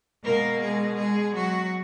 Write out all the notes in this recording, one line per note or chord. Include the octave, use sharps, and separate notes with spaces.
B2 G#3 A#3 A#4
G#3 G#4
G#3 G#4
F#3 F#4